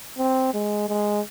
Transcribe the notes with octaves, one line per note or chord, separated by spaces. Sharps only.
C4
G#3
G#3